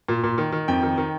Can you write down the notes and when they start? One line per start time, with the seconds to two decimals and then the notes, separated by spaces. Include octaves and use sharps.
0.09 A#2
0.24 A#2
0.38 D#3
0.53 D#3
0.68 F2 G5
0.83 D#3
0.98 D#3